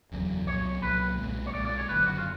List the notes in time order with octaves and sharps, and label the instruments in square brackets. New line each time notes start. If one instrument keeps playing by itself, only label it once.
[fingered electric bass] F#1 E2 C#3 F#3
[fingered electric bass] C2 A#2 F#3 [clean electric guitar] C#5
[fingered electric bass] C2 A#2 F#3 [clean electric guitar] B4
[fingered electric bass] F3 G#3
B1 A#2
[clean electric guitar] C#5
[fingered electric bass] B1 A#2 F3 G#3 [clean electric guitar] D5
[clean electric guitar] D5
C#5
[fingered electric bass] F#1 F#2 D3 [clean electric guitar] B4
[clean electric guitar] F#4
F4